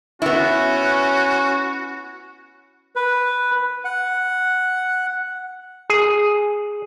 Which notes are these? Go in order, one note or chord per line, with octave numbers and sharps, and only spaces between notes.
B3 C#4 E4 F#4
B4
F#5
G#4